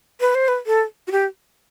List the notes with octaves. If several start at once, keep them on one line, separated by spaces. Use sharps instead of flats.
B4
C5
B4
A4
F#4
G4